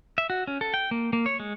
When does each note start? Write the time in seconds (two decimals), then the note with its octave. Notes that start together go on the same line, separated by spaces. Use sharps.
0.18 E5
0.30 F#4
0.47 C#4
0.61 A4
0.74 G5
0.91 A#3
1.13 A#3
1.26 C#5
1.40 G#3